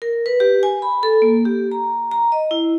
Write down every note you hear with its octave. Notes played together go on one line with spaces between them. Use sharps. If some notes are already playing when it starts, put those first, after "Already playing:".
A#4
B4
G4
G#5
B5
A4
A#3
G4
A#5
A#5
D#5
E4